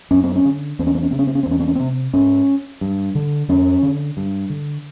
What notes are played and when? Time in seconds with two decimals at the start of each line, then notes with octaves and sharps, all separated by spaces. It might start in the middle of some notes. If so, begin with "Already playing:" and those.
0.11 F#2 C#4
0.23 C4
0.36 C#4
0.45 D3
0.79 E2 C4
0.87 C#4
0.95 C4
1.03 C#4
1.11 C#3 C4
1.19 C#4
1.27 C4
1.35 C#4
1.43 E2 C4
1.51 C#4
1.60 C4
1.67 C#4
1.76 C3 C4
2.14 G#2 C#4
2.81 G2
3.15 D3
3.49 F2 C#4
3.82 D3
4.17 G2
4.50 D3